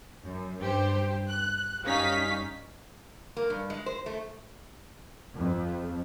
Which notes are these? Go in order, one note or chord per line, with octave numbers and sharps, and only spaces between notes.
F#2
G2 G4 C5
F#6
F#2 G3 C#4 D#4 F5 B6
A#3
G2
G#3
C5
A3
F2